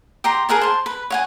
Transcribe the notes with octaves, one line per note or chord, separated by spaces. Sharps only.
G4 A#5 C6
G#4 A#4 F#5 A5
C5 A5
B4
C#5 F#5 G#5